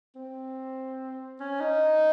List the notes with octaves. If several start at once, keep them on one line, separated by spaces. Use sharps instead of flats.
C4
C#4
D#4